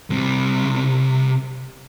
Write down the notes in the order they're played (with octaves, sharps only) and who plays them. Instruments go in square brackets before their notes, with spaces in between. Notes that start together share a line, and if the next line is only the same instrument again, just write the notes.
[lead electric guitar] C2 C3